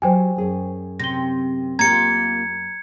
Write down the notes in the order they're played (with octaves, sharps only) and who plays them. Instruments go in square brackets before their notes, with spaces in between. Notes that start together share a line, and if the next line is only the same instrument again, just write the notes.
[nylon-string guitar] F#3 G4 [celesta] C5 G5 G#5
[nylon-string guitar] F#2 G#4 C#5
[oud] C3 [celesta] A#6 G7
[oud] A#3 F4 G4 [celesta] A#5 [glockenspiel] G#6 C#7